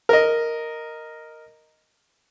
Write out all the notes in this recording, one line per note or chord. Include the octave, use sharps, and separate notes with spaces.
A#4 D#5